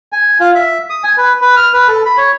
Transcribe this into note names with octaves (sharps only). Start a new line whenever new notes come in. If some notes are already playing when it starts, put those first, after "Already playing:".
G#5
F4
E5
D#6
G#5
B4
B4
F6
B4
A4
B5
C#5